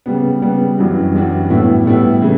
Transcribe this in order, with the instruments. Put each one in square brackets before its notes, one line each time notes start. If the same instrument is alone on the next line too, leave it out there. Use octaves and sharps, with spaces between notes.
[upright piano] C#3 G3 B3
C#3 G3 B3
F#2 E3 G3 D4 F#4
F#2 E3 G3 D4 F#4
A2 G3 B3 E4
A2 G3 B3 E4
C#3 E3 A3